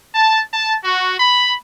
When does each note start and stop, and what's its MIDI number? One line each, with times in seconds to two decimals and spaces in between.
0.14 0.40 81
0.53 0.74 81
0.84 1.15 66
1.19 1.54 83